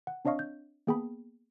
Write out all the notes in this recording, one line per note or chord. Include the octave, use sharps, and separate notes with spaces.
F#5
C4 D4 C#5 D#5 F5 C#6
G6
A#3 B3 G#4 G5 A5 B5